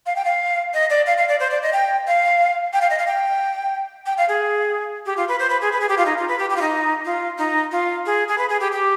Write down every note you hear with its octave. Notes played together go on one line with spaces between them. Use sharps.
F5
G5
F5
D#5
D5
F5
F5
D5
C5
D5
D#5
G5
F5
G5
F5
D#5
F5
G5
G5
F5
G#4
G4
F4
B4
C5
B4
G#4
B4
G#4
G4
F4
D#4
F4
B4
G4
G4
F4
D#4
F4
D#4
F4
G#4
G#4
B4
G#4
G4
G4